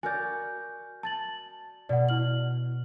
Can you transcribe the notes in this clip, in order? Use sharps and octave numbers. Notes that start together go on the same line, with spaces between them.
F#4 A#4 D5 G#5 G6
A5 A6 F#7
B2 D5 F#5
E4 F6 F#7